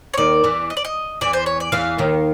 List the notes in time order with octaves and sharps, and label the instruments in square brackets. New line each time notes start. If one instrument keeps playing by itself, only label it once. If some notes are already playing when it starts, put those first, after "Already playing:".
[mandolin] C#5
[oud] D#2 D#3 [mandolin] D5
[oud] E2 E3
[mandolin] D#5
D5
D#5
[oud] E2 E3 [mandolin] D5
[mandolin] C5
C#5
D5
[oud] E2 E3 [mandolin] F5
[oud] D#2 D#3